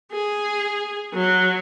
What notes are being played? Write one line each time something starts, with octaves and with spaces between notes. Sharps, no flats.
G#4
F#3